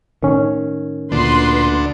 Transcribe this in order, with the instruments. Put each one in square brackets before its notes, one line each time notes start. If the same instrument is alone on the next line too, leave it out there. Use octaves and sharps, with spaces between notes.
[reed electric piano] A2 C#4 [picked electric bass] D#3
[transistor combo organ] D2 D4 [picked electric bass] A#2 [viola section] B4 C6